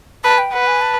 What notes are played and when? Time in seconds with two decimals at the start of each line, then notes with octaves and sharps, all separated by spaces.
0.24 B4 A5
0.38 G5
0.52 B4 F#5
0.67 G#5
0.81 A5